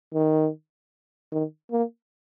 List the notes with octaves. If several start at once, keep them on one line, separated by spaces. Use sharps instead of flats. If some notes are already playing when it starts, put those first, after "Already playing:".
D#3
D#3
A#3